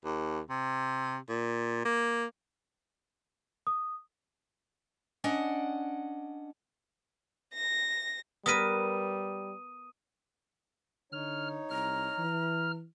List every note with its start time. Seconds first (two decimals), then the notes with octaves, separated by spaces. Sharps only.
0.05 D#2
0.50 C3
1.29 A#2
1.85 A#3
3.67 D#6
5.24 C#4 D4 D#5 F#5
7.53 A#6
8.46 G3 B3 A#4 B4 D#6 D#7
11.12 D3 D#4 C#5 F6
11.70 C2 A#5 F6
12.18 E3